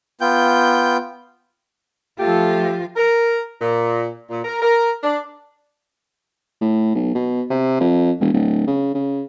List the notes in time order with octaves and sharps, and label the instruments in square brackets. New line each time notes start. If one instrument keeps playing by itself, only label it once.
[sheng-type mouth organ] B3 F4 G5 G6
[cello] F3 F4 [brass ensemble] A3 A4 [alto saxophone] G4
[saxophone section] A#4
A#2
A#2
A#4
A#4
D4
[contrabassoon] A2
B1
B2
C3
F2
E1
D1
C#3
C#3